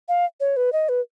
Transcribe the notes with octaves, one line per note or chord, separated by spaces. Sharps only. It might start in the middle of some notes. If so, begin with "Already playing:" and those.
F5
C#5
B4
D#5
B4